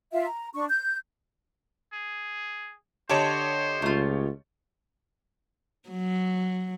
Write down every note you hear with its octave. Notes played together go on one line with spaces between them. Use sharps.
F4 E5 F5
A#5
D4 C#6
G6
G#4
D3 G4 C5 C#5 D#5 A5
C#2 A3 F4
F#3